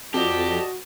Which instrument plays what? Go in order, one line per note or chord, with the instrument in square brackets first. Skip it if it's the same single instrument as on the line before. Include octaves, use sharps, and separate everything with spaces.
[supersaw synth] F2 [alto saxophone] F#4 [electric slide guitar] G4 [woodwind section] D5 D#5 A5